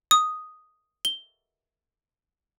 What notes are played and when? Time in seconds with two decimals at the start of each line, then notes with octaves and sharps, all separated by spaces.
0.11 D#6
1.05 G7